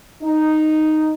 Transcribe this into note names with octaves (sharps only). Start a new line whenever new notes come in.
D#4